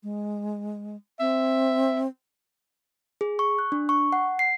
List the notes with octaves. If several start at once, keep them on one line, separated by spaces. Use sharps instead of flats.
G#3
C4 E5
G#4
C#6
F#6
D4
C#6
F#5
C7